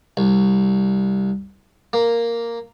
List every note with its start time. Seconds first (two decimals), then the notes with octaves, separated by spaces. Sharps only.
0.17 C2
1.93 A#3